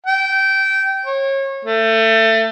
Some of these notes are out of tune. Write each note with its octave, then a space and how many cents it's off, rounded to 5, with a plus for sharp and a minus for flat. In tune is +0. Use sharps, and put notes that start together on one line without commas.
G5 -20
C#5 -30
A3 +25